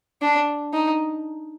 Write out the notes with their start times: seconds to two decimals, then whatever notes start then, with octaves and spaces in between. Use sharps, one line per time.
0.22 D4
0.73 D#4